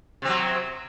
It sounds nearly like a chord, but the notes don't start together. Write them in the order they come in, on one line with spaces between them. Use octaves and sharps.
C3 C4 F#3